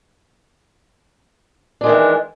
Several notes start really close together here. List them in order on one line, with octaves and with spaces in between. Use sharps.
D4 G#3 D#3 E3